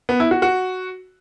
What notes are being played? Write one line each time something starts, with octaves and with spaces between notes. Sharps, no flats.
B3
E4
F#4
F#4